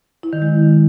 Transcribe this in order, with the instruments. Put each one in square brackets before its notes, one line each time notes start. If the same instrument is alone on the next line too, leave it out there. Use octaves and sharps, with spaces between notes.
[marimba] E4
D#3
G#3